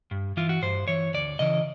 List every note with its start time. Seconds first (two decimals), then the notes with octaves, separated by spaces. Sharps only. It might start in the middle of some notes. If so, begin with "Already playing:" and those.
0.11 G2
0.37 E3 F4
0.49 F#4
0.62 G2 C5
0.88 E3 C#5
1.14 D2 D5
1.39 C#3 E3 D#5